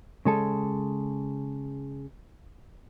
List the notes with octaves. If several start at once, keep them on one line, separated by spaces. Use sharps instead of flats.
C#3 G#3 A4